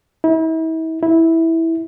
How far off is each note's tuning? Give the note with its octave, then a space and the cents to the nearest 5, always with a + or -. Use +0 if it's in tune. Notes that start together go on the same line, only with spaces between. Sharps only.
E4 -40
E4 -10